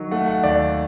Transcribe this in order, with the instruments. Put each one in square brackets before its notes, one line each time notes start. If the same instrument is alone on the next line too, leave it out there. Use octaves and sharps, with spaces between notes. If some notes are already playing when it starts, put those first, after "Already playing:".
Already playing: [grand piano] D#3 F#3
A3 F#5
F#5
D#2 D5